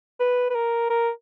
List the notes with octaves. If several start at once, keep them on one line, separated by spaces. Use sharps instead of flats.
B4
B4
A#4
A#4